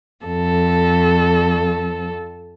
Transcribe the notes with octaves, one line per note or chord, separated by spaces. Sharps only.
F2 A4